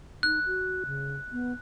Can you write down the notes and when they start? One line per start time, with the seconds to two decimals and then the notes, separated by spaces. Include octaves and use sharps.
0.23 D#4 F#6
0.46 F#4
0.86 C#3
1.32 B3